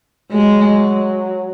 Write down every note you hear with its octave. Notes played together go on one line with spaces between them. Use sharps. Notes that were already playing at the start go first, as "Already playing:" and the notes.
F#3 G#3